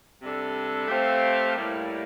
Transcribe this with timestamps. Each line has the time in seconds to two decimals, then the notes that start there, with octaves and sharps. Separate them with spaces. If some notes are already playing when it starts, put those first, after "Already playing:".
0.22 C3 G3 D4 A4
0.88 A3 C4 G4 C5 F5
1.54 A2 G3 A#3